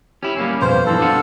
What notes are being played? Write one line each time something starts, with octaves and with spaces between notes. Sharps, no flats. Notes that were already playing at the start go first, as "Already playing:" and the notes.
C#4 E4 G4
G3 A#3 C#4 C7
F2 B2 C5 F5
G2 E3 C4 A4
D4 F4 F#5